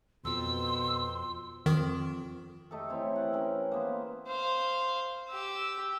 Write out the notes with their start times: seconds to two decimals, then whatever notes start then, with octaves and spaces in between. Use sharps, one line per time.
0.25 F2 B2 F3 C6 E6
1.66 F2 D#3
2.71 A3 D#4 G4 A4
2.89 E3 C4 E4 C#5
3.16 F#5 G5
3.33 C#4 A#4 G5
3.72 A#3 B3 C5
4.27 C5 F5
5.29 G4 E6